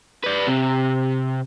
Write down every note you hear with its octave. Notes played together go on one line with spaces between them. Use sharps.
B4 D5
C3